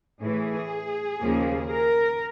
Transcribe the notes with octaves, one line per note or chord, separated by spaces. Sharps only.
A2 E3 A3 G#4
D#2 C#3 F3 A#3
A#4